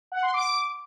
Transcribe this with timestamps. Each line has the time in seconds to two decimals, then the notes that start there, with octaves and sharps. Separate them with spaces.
0.12 F#5
0.23 C6
0.34 D6